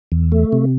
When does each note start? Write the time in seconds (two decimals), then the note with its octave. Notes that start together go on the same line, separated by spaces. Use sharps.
0.12 E2
0.32 A3
0.52 C3